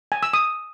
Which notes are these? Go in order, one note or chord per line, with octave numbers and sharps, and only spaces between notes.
G#5
E6
D#6